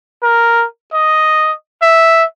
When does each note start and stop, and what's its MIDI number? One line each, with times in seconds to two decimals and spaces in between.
0.22 0.65 70
0.93 1.52 75
1.82 2.24 76